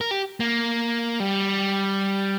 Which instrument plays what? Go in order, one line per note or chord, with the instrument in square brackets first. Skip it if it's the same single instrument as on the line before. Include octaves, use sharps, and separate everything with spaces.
[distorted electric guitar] A#4
G4
A#3
G3